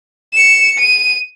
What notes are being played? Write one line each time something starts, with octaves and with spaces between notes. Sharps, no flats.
C#7 E7
D#7